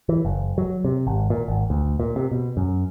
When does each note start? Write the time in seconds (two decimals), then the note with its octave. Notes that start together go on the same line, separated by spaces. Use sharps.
0.09 E3
0.25 F#1
0.58 F#3
0.85 C3
1.07 G#1
1.30 A#2
1.48 G#1
1.70 D2
2.00 A#2
2.16 C3
2.32 B2
2.57 F#2